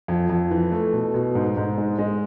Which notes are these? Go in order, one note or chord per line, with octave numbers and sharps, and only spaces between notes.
F2
F2
E3
A3
B2
B2
G#2
G#2
G#3
G#3